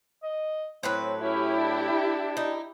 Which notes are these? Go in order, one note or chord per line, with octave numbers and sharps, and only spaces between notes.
D#5
A2 F#3 C4 B4
C#4 E4 G4
D4
D#4